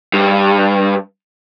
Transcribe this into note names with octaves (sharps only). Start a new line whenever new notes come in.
G2